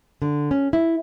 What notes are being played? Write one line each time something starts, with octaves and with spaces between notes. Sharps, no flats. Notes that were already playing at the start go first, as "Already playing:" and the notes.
D3
C#4
E4